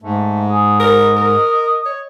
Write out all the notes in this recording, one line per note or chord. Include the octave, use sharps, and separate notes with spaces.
G#2 A3
G#4
A#4 D#5
A#4
C#5